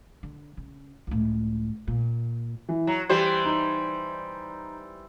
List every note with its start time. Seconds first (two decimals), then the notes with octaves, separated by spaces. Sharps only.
0.23 D3
0.57 C#3
1.07 C#2 A2
1.88 A#2
2.69 E3
2.87 F#3 A#5
3.09 E3 G3 G4 C5
3.45 D#4